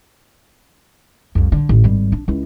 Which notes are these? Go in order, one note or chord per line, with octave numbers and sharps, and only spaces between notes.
C2 F2
D3
A1
G#1 G3
D4
C#2 E4